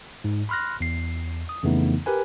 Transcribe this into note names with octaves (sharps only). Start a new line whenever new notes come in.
G#2
B5 C6 F6 F#6 A#6
E2 C7
D#6
F2 C#3 E3 A3 B3 D#4
G4 A#4 B4 G#5